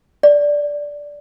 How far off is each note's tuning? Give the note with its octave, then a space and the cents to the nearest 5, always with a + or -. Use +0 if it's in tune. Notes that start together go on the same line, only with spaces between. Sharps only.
D5 -5